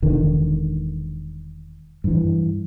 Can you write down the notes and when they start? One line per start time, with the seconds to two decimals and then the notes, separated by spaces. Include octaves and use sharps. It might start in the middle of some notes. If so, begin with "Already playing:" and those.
0.02 E1 D3 D#3
2.04 G2 E3